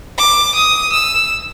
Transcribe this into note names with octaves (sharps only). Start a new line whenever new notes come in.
D6
D#6
E6